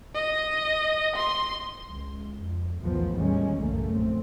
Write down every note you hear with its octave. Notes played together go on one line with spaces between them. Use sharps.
D#5
C6
C#2
F2
B1 E2 A2 D#3 F3 B3
A1 E2 D#3 G3 G#3 C#4
B1 F#2 A2 C#3 A3 A#3
A#1 C4